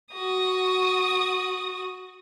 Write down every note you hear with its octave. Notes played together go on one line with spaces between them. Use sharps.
F#4 D#6